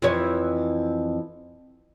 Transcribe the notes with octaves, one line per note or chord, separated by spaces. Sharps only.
F2 E3 C#5